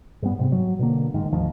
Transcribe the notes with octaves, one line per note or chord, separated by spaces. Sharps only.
G2 G3 B3
G#2 C3
F#3
B2 D3 A#3
G1 G#2 D#3
D2 G2 D#3 F3